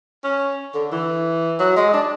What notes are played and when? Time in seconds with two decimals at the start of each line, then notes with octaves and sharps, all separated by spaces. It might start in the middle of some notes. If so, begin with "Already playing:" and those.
0.24 C#4
0.74 D3
0.92 E3
1.60 F#3
1.77 G#3
1.94 D4